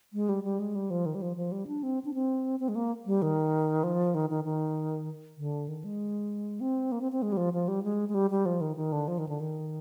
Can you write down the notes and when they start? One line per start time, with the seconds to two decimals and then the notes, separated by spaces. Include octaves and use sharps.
0.13 G#3
0.29 G3
0.44 G3
0.59 G#3
0.75 G3
0.90 F3
1.06 D#3
1.15 G3
1.22 F3
1.37 F3
1.52 G3
1.67 D4
1.83 C4
2.05 D4
2.14 C4
2.60 C4
2.69 G#3
2.75 A#3
3.06 G3
3.22 D#3
3.84 F3
4.15 D#3
4.30 D#3
4.44 D#3
5.37 D3
5.68 D#3
5.84 G#3
6.61 C4
6.92 A#3
7.01 C4
7.12 C4
7.22 G#3
7.32 G3
7.37 F3
7.53 F3
7.68 G3
7.83 G#3
8.09 G#3
8.15 G3
8.30 G3
8.46 F3
8.61 D#3
8.76 D#3
8.92 D3
9.08 F3
9.19 D#3
9.29 D3
9.40 D#3